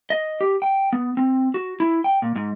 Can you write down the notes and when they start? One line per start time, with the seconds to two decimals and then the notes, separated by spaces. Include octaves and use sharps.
0.10 D#5
0.41 G4
0.62 G5
0.93 B3
1.17 C4
1.54 F#4
1.80 E4
2.04 G5
2.22 A#2
2.36 G#2